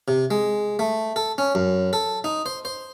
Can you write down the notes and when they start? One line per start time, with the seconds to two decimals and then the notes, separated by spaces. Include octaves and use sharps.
0.08 C3
0.31 G#3
0.79 A3
1.16 A4
1.38 C#4
1.55 F#2
1.93 A4
2.24 D#4
2.46 C5
2.65 C5